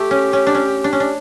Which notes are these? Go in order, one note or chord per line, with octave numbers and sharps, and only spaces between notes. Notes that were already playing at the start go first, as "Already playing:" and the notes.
Already playing: A3 G4
C#4
C#4
D4
C#4
D4
C#4
D4